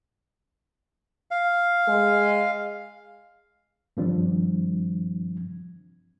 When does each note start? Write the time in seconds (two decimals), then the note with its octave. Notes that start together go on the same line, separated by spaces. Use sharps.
1.31 F5
1.88 G#3
3.97 G2 D#3 F3 G3 C4 D4